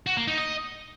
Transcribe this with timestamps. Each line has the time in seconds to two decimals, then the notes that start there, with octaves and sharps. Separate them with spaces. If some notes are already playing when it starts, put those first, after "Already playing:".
0.07 F#4
0.17 A#3
0.27 D#4
0.38 D#5